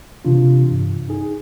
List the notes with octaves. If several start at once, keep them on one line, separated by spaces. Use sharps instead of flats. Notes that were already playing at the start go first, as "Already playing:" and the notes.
C3 E3 D4 F4
G2
D#4 G#4